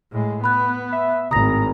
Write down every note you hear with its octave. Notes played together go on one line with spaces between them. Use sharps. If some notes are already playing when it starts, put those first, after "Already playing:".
A2 G#3
B3 B5 F#6
E5
G#1 A2 A#5 D#6 A#6